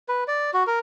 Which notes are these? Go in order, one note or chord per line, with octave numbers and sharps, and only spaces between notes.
B4
D5
F#4
A#4